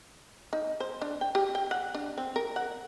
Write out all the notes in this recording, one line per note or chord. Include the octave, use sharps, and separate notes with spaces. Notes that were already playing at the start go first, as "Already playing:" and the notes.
D#4
C5
D4
G5
G4
G5
F#5
D4
C4
A#4
F#5